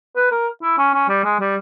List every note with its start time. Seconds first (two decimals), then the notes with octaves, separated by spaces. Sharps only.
0.16 B4
0.31 A#4
0.62 E4
0.78 C#4
0.94 C#4
1.09 G3
1.24 G#3
1.40 G3